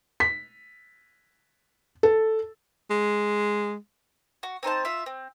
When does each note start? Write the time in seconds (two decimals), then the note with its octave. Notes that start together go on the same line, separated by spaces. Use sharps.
0.20 B6
2.03 A4
2.90 G#3
4.43 F#4
4.63 C4 D#4 C5 A5
4.85 F4 E5
5.06 C4